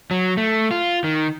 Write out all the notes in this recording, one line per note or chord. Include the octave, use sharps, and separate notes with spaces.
F#3
A3
F4
D#3